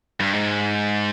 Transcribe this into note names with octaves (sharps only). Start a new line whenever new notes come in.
G2
G#2